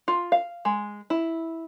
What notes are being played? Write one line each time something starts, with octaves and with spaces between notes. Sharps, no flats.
F4
F5
G#3
E4